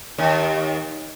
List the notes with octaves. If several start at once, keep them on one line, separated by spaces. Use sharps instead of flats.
D#2